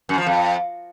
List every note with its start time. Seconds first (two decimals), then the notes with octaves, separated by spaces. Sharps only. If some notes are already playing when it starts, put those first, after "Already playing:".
0.09 F#2
0.18 F3
0.27 F2